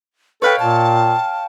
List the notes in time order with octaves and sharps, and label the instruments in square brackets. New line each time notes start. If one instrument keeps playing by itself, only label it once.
[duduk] A4 [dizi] B4 [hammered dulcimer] C#5 F5 G5
[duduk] A#2 [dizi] A5